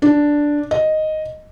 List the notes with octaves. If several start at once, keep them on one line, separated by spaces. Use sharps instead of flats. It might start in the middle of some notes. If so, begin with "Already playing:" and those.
D4
D#5